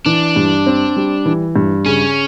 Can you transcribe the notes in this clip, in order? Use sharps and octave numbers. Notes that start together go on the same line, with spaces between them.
E3 D4
G2
C4
G3
E3
G2
C#3 C#4